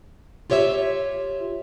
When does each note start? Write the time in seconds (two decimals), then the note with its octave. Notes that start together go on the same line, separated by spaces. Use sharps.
0.50 F4 G4 C#5 D5 E5